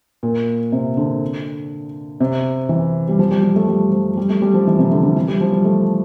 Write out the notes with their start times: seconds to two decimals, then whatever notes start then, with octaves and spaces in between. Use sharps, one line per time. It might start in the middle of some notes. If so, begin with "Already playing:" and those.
0.23 A#2
0.72 C3
0.97 D3
2.20 C3
2.69 E3
3.09 G3
3.19 F3
3.31 G3
3.43 G3
3.56 A3
3.68 G3
3.92 F3
4.17 G3
4.29 A3
4.42 G3
4.54 F3
4.67 E3
4.79 C3
4.92 D3
5.03 D3
5.16 E3
5.28 G3
5.41 F3
5.52 G3
5.65 A3